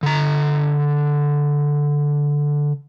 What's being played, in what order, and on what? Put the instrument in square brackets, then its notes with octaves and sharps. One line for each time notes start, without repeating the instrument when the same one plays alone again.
[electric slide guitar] D3 A#5